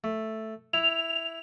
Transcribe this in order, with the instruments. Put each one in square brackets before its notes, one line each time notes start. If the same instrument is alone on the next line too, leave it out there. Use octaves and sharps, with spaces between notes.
[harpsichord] A3
[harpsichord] E4 [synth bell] F7